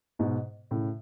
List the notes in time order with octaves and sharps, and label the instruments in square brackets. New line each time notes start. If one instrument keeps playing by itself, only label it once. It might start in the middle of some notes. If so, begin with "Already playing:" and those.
[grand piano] G#2 B2
A2 C#3